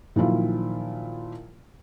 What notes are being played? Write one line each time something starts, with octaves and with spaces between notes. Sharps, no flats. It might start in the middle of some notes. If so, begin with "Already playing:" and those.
A#2 D#3 F3 F#3 E4 F4